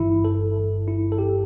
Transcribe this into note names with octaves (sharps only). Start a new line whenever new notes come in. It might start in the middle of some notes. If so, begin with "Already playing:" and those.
Already playing: G1 G2 E3 E4
A4
E4
A4
G4